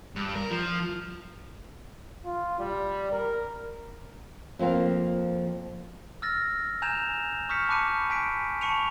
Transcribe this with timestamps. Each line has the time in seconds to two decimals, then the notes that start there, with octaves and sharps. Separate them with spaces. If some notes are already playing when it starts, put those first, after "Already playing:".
0.16 G2
0.35 A#4
0.51 F3
2.25 F4
2.60 G3
3.12 A#4
4.59 F2 F3 A#3 A#4 F5
6.22 E6 F6 A6 A#6
6.82 G#5 A#5 G6 G#6 E7 F7
7.49 C#6 D#6 F6 G6 B6 C#7
7.68 A5 B5 D6 F#6 C#7 D#7
8.10 G#5 B6 D7
8.61 A5 B5 C#6 C#7 D#7 F7